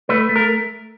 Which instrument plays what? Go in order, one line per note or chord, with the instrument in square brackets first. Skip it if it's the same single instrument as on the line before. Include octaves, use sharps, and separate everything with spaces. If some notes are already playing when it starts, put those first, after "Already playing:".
[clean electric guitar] A3 B4
A3
A#4